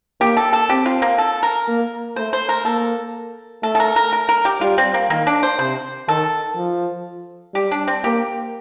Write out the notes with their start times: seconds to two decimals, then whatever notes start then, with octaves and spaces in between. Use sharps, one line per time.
0.20 A#3 G4
0.37 A4
0.53 A4
0.69 C4 G4
0.86 F4
1.02 A#3
1.18 A4
1.43 A#4
1.68 A#3
2.16 A3 C5
2.33 C5
2.49 A#4
2.65 A#3 A4
3.63 A3 A4
3.75 A4
3.80 A#4
3.96 A#4
4.12 A#4
4.29 A#4
4.45 G4
4.61 G3 F4
4.78 C4
4.94 A#3
5.10 D#3 A#3
5.27 D4
5.43 C5
5.59 C3 C5
6.08 D#3 A4
6.57 F3
7.54 G3 G4
7.71 D4
7.87 C4
8.04 A#3 G4